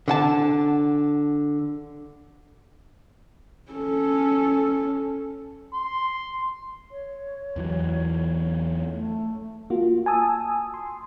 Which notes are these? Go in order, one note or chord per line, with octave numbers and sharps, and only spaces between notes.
D3 F#5 A5
C#4 A4
C6
C#5
E2 E3 F#3
A3
A#3 F4 F#4
G#5 A5 D#6 E6
C6